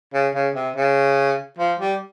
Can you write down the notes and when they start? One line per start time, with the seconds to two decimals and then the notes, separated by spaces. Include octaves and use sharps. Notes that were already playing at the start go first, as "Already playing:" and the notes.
0.14 C#3
0.35 C#3
0.55 C3
0.76 C#3
1.59 F3
1.80 G3